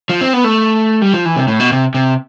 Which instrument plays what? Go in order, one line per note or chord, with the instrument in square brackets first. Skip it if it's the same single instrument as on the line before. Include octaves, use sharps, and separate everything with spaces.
[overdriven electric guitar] F3
C4
B3
A3
G3
F3
E3
C3
A2
B2
C3
C3